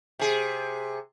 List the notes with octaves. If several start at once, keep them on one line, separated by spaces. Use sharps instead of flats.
C3 G#4